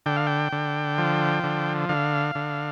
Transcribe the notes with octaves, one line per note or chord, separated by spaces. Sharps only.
D3 G5
F5
G5
D3
F3
D3
D3 F5
D3